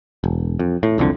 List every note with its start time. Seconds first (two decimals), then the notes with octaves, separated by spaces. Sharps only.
0.24 E1
0.59 F2
0.83 A2
0.98 E1 C2 F2 D3